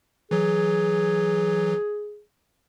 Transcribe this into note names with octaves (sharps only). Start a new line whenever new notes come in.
E3 F#3 G#4